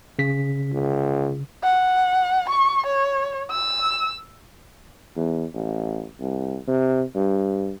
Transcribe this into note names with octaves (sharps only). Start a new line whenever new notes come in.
C#3 B6
C#2
F#5
C#6
C#5
E6
E2
A1
C2
C3
G2